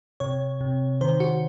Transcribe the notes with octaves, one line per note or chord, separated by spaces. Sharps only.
C3 C#5
C3
D#3 C5
F#4